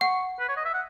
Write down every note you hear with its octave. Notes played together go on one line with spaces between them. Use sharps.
F#5 C#6
B4
C#5
D#5
E5
F#5